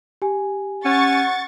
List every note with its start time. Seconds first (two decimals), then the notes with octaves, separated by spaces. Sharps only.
0.22 G4 G#5
0.85 C#4 F#5 C#6 A6